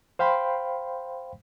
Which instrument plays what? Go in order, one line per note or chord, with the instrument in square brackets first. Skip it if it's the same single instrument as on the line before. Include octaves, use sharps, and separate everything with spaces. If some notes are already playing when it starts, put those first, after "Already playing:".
[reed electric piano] C5 F5 G5 B5 C6